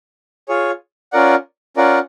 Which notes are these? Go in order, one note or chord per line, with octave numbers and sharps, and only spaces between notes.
F4 G#4 C#5
C#4 F4 A#4 D5 F#5
C#4 F4 A#4 D5 F#5